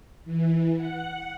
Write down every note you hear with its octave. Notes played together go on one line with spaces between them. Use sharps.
E3
F#5